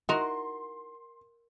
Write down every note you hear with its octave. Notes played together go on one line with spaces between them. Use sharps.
D#4 E4 F#4 A#4 C6